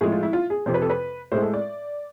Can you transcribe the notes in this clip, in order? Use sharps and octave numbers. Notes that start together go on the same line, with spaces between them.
A2 F3 G#3 G#4
F4
E4
F4
G#4
F2 C3 F3 C5
B4
A4
B4
A2 G#3 C5
A4
D5